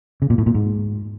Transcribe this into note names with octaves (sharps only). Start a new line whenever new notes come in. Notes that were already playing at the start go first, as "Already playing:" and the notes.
C#3
A#2
A2
A#2
G#2